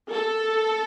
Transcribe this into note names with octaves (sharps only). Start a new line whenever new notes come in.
A4